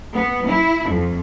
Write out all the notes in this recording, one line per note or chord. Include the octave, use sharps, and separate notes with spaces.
B3
E4
F2